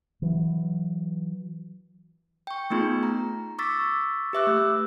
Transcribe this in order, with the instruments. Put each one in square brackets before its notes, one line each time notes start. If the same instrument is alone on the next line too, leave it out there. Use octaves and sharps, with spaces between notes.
[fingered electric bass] E3 F#3
[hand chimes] G5 C#6
A3 B3 D#4 F4 G#4
A#5
C#6 D6 E6 A6 B6
G4 B4 E5 D6 E6 F#6
A3